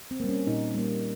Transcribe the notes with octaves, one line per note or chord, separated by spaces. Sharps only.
C4
G3 A#3
C#4
A#2 D#4
G3 A#3